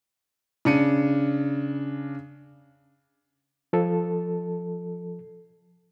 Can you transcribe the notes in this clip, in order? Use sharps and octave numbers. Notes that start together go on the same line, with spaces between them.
C#3 D4 C#7 D#7
F3 A4